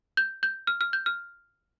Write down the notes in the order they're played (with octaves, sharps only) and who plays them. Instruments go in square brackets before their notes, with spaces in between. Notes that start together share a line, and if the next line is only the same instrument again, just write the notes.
[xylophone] G6
G6
F6
F6
G6
F6